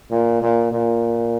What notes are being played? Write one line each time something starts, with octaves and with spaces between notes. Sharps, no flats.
A#2
A#2
A#2